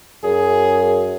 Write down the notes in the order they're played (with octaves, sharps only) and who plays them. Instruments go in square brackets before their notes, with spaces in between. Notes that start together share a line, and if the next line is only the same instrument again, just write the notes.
[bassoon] F#2 [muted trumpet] G#4